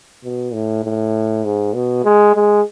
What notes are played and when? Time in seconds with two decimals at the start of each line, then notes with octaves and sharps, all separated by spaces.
0.24 B2
0.53 A2
0.84 A2
1.44 G#2
1.74 B2
2.04 G#3
2.35 G#3